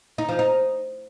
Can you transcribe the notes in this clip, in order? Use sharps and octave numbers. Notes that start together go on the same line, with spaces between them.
D#4
F3
D#4